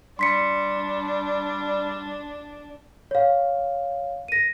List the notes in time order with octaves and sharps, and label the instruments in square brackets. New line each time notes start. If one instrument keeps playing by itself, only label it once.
[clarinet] G3 [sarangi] D4 [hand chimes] C6 B6 C#7
[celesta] C#5 F5
A#6 D#7